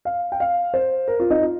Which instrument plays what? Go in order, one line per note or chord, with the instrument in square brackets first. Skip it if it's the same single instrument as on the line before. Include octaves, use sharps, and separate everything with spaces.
[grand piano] F5
G5
F5
C5
A#4
F4
D#4
F4